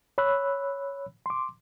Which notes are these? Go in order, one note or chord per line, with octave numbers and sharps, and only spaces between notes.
C#5 B5 E6 F#6
C6 D6